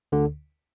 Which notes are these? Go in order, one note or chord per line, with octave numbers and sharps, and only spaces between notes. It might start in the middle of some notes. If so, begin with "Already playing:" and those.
D2 D3